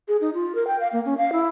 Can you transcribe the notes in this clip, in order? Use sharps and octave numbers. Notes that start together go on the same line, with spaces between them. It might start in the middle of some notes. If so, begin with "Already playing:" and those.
G#4
D#4
F4
A#4
G5
F5
A#3
C#4
F5
E4